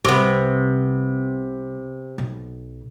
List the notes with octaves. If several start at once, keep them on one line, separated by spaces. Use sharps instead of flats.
C2 C3 B3
B1